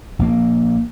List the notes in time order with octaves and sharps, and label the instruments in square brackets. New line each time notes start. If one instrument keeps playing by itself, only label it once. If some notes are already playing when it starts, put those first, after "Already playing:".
[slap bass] A#1 A#3